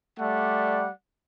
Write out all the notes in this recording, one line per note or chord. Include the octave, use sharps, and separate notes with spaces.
G3 A3 D5 F#5